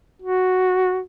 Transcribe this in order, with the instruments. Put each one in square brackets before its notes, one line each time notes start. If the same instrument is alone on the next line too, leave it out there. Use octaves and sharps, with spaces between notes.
[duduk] F#4